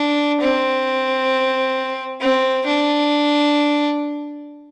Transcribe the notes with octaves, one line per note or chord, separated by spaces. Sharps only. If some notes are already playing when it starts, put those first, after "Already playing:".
Already playing: D4
C4
C4
D4